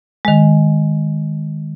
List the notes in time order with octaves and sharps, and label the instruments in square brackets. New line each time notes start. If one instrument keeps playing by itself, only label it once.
[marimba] D#3 G#3